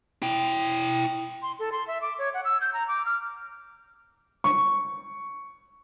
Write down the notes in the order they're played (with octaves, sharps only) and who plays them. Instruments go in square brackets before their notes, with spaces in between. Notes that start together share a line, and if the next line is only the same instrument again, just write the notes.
[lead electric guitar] E4 G5
[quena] C6
A4
C6
E5
D6
C#5
F#5
E6
G6
A#5
D6
F6
[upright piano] C#6